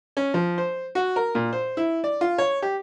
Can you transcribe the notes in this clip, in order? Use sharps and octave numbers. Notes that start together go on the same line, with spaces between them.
C#4
F3
C5
F#4
A#4
A#2
C5
E4
D5
F4
C#5
G4